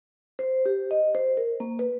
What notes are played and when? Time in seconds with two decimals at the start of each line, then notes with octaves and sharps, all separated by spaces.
0.39 C5
0.66 G4
0.91 D#5
1.15 C5
1.37 A#4
1.60 A#3
1.79 B4